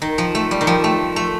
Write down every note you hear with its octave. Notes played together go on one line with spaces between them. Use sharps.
D#3
F3
A3
G3
D#3
F3
A3
A3